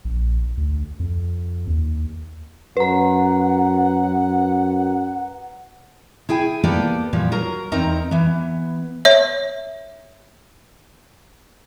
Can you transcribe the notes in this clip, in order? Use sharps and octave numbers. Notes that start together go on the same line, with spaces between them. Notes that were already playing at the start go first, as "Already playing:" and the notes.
A#1
D2
F2
D#2
F#2 B4 F#5 A#5
E4 G#4 G5 G#5
A#3 B3 G4 A4 D5
A#2 E3 F3 G3
F#3 A#4 A#5
E2 C4 D#4 A#4 A#5
E3 B3
C#5 E5